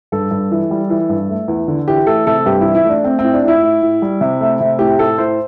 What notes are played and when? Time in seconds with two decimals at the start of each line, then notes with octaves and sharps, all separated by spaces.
0.12 G2 A4
0.31 G2
0.51 E3
0.71 G3
0.90 E3
1.09 G2
1.30 A3
1.48 E2
1.68 D3
1.88 E3 G4
2.07 A3 A4
2.27 C3 A4
2.46 G2 G4
2.61 E3 E4
2.75 E4
2.85 A3 D4
3.04 A3 C4
3.19 C4
3.24 A2
3.34 D4
3.44 A2 E4
3.62 A2
3.82 A2
4.02 G3
4.21 C3
4.40 A3
4.60 C3
4.79 A2 G4
4.99 A2 A4
5.18 A2 C5